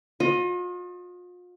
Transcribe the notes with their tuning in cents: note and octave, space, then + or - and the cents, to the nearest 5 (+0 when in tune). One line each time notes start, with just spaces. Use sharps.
F4 +40 D#5 +0